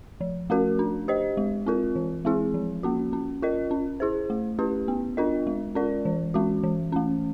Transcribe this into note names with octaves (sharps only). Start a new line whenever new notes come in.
F3
A3 C#4 F#4 A#4
D4
G4 C5 D#5
G#3
C4 F4 A#4
E3
G#3 C4 E4 G#4
F3
A#3 C#4 F#4
C#4
F4 A#4 D#5
C#4
E4 G#4 C5
A3
C#4 E4 G4 B4
B3
D4 F4 A#4 D#5
G#3
C#4 F4 A#4 D5
E3
G#3 C#4 F#4
E3
A3 C#4